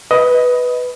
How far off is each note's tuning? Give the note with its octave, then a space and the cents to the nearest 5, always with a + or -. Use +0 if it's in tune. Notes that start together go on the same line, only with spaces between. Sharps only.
B4 +0 D#5 +15